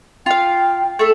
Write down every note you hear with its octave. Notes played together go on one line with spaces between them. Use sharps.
F4 F5 G5
A3 A4